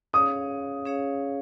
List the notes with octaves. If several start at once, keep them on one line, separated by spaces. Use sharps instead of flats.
C#4 G#4 C#5 F5 D#6
C#4 G#4 C#5 F5